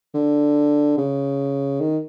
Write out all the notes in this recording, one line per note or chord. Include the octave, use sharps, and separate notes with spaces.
D3
C#3
D#3